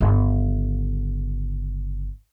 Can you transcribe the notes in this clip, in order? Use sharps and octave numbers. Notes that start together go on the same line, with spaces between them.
G1 C#3